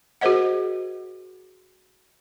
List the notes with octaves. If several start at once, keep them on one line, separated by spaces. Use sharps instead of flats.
F#4 G#4 A#4 C5 D#5 F#5